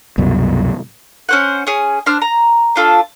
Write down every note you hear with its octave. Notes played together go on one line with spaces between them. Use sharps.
C2 F#2 B2
C#4 C5 F#5
C#4 G#4
D4 C5 F6
A#5
D4 F4 A4